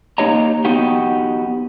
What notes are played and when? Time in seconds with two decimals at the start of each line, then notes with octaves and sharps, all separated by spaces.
0.18 A#3 D#4 G4 C#5 D#5 A#5
0.65 B3 D#4 F#4 G4